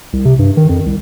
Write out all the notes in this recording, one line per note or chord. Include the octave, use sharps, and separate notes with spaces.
C2
C3
G2
D#3
F2
C2